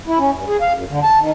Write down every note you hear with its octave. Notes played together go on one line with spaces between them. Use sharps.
E4
C#4
G2
G#4
F5
F#2
D3
A5
D#3